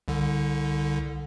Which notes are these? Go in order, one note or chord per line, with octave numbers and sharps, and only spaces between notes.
C2 D3